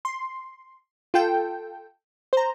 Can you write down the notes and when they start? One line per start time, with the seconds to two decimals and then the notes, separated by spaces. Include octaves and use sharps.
0.05 C6
1.14 F4 A4 G5
2.33 C5 A#5